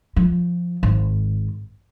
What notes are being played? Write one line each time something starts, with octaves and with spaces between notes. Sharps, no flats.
F3
G#1